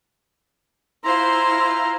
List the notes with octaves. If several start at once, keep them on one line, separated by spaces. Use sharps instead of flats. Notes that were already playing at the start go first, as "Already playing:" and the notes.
E4 F4 C5 A#5 C6